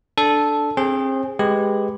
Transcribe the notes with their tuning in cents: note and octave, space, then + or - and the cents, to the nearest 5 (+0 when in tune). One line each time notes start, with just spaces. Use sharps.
D4 +5 A4 -5
C4 +30 G#4 -10 C5 +35
G#3 +0 G4 +0 B4 +0